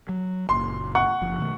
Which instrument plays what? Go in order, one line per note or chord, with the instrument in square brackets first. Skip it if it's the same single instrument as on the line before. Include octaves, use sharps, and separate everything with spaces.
[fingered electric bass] F#3
[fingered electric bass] F#1 A#2 [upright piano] C6
[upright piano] F#5 C#6
[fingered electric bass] F#1 F3
B2 D#3 A3